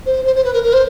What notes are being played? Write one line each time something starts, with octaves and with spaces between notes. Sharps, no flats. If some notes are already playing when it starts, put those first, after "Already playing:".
C5
C5
C5
B4
A#4
A#4
C5